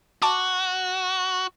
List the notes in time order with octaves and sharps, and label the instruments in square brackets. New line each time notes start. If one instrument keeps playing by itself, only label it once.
[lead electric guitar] F#4 [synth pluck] A5 D6